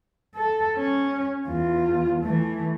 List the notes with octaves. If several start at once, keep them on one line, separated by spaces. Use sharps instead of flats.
A4
C#4
E2 F4
E3 A3